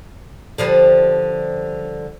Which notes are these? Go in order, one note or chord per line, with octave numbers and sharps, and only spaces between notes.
D3 F3 G3